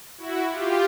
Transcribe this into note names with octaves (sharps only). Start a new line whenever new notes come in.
E4 F#4
F4 G4